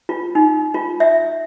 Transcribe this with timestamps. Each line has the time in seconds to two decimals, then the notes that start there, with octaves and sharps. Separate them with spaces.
0.09 F4
0.35 D#4
0.74 F4
1.00 E5